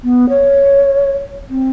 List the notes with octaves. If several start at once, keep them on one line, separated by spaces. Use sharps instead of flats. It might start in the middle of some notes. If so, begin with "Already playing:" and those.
B3
C#5
C4